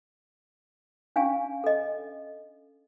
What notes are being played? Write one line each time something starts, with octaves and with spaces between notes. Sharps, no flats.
C#4 D4 F5 G#5 C#6
A4 D#5